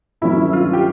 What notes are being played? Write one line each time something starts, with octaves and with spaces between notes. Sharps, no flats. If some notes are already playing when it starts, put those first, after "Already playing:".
G2 D#3 F#3 A3 C#4 E4
F4
G4